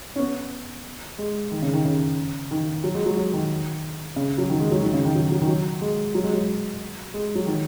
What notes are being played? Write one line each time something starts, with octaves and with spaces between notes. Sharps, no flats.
C#4
B3
G#3
D#3
C#3
D#3
C#3
D#3
F#3
G#3
F#3
F#3
D#3
C#3
F#3
D#3
G#3
F#3
D#3
C#3
D#3
F#3
F#3
D#3
F#3
G#3
F#3
G#3
F#3
G#3
F#3
D#3